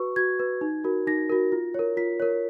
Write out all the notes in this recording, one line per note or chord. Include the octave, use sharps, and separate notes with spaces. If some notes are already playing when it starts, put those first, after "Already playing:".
Already playing: F#4 B4 C#6
F#4 G#6
B4
D#4
F#4 A#4
D#4 A#6
F#4 A#4
F4
A#4 C#5
F4 B6
A#4 C#5